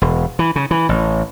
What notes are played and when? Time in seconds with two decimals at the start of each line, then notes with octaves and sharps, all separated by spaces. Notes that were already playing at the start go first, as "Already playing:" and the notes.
0.02 E1
0.39 E3
0.56 C#3
0.71 E3
0.89 A1